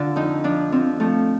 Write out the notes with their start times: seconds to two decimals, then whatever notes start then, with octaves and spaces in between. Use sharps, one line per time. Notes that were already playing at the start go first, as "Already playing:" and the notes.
Already playing: D3 F4
0.16 F2 D#4
0.44 F3 D4
0.72 F3 C4
1.00 F3 A3